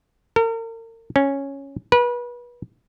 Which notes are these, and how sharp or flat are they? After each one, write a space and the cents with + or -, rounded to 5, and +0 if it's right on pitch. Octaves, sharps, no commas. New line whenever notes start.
A#4 -40
C#4 -5
B4 -30